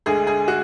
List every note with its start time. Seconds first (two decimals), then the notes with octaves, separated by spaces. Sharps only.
0.06 D2 D3 G#3 G#4
0.27 G#4
0.48 F#4